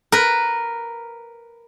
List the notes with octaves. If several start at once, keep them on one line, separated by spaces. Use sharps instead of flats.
A#4 B4